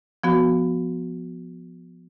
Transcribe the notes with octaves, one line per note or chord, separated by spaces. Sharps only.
F3 B3 F#4